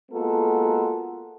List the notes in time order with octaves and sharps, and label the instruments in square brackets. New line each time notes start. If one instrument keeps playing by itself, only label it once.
[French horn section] G#3 A#3 B3 F4 F#4 A4